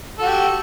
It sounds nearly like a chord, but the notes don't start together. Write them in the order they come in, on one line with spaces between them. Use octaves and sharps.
A4 F#4 G4